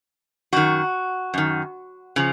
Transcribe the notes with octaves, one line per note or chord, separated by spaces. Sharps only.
F#2 D#3 F#4
F#2 D#3
C#3 F3